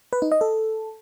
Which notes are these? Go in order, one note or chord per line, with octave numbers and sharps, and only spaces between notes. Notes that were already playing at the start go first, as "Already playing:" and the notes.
B4
D#4
D#5
A4